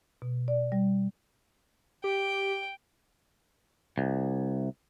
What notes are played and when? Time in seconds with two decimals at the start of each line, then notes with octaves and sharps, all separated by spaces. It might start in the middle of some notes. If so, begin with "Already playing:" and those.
0.22 B2
0.48 D5
0.72 G3
2.04 G4 G5
3.98 C2